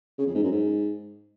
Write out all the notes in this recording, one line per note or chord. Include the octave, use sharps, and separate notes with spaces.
C#3
F2
G#2
F#2
G#2